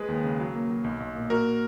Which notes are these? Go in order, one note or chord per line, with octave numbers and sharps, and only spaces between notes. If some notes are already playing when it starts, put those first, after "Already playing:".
Already playing: G#3 G#4 B4
D#2
C#3
F#3
A#3
F#3
B1
B1
A#2
A#3 F#4 A#4